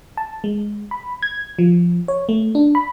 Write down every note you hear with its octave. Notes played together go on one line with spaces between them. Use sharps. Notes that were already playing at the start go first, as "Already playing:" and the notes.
A5
G#3
B5
G#6
F3
C#5
A3
D4
B5